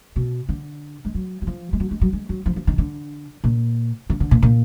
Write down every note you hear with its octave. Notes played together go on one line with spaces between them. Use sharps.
B2
D3
G#3
F#3
F#3
F3
G#3
F#3
G#3
F#3
G#3
F#3
F3
F3
D#3
D3
A#2
D3
D3
A#2
A#2